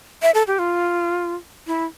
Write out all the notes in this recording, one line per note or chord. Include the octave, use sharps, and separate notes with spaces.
E5
A4
G4
F4
E4